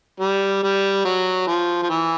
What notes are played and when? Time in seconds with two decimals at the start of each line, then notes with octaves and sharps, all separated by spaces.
0.20 G3
0.63 G3
1.05 F#3
1.47 F3
1.83 F3
1.90 E3